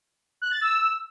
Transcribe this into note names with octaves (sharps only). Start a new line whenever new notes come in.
F#6
A6
E6